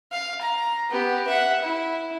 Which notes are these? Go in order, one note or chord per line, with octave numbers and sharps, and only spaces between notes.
F5
A#5
B3 G4
E5 F#5
E4